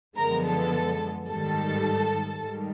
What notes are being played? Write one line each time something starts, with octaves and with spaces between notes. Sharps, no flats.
F#2 D3 F3 G#3 B3 A#4 A#5
A4 A5
G#2 D#3 G3 A4 A5
G#2 D#3 G3